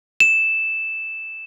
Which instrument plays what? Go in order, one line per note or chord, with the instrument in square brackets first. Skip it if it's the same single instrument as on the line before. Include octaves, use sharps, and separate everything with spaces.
[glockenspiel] E7